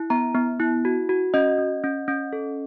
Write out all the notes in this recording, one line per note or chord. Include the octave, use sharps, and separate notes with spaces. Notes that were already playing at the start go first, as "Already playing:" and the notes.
Already playing: E4
B3 A#5
B3
E4
F#4
F#4
C#4 D#5
C#4
C#4
C#4
A4